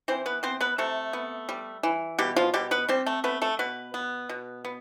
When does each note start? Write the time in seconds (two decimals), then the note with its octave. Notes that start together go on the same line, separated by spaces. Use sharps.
0.08 E3 C4 C5
0.26 B3 B4
0.43 B3 C4 C5
0.60 B3 B4
0.78 C3 A3 A4
1.13 B3
1.49 G3
1.83 E3
2.19 B2 G3 G4
2.36 F3 F4
2.54 B2 G3 G4
2.71 B3 B4
2.89 G3 C4 G4
3.06 A3 A4
3.24 A3 B3 B4
3.42 A3 A4
3.59 B2 B3 B4
3.94 B3
4.29 B2
4.65 B3